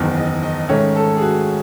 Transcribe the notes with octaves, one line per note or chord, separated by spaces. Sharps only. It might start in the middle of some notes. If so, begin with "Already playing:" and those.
Already playing: F#1 E2 D#3
D#5
D#5
G#2 D#3 A3 C#4 C#5
A4
G#4
F#4